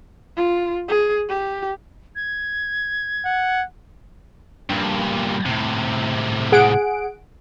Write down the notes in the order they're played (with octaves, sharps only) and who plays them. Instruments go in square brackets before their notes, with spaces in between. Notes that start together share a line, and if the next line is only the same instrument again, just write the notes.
[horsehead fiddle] F4
G#4
G4
[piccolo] G#6
[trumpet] F#5
[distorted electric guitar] G2 A#2
A2 C3
[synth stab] G#4 F#5 D7